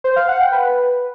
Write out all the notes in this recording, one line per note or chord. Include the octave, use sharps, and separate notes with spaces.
C5
F5
F#5
G5
B4